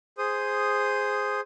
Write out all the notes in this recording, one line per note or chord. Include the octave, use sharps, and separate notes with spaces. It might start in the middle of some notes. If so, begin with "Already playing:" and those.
G#4 C5 D#6